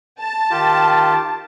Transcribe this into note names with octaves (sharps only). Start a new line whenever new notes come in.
A5
D#3 F4 G4